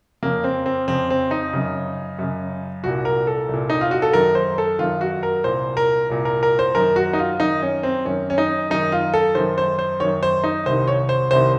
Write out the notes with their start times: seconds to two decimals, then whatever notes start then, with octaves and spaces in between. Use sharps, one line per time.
0.23 F2 C#3 A#3
0.44 C4
0.66 C4
0.87 F2 C#3 C4
1.10 C4
1.31 D#4
1.53 F#2 C#3
2.19 F#2 C#3
2.84 C2 A#2 F#4
3.05 A#4
3.27 A4
3.49 C2 A#2
3.70 D#4
3.81 F4
3.91 F#4
4.02 A4
4.13 F#2 D#3 A#4
4.35 C5
4.58 A4
4.79 F#2 D#3 F4
5.01 F#4
5.23 A#4
5.44 C2 A#2 C5
5.77 A#4
6.10 C2 A#2
6.25 A#4
6.43 A#4
6.59 C5
6.75 F#2 D#3 A#4
6.96 F#4
7.13 D#4
7.19 F4
7.39 F#2 D#3 D#4
7.62 C#4
7.83 C4
8.05 F#2 D#3 C#4
8.30 C#4
8.38 D#4
8.70 F#2 D#3 D#4
8.92 F4
9.14 A4
9.35 F#2 D#3 C5
9.58 C5
9.79 C5
10.00 F#2 D#3 C#5
10.23 C5
10.44 D#4
10.66 C2 C3 D#3 C5
10.87 C#5
11.09 C5
11.31 C2 C3 D#3 C5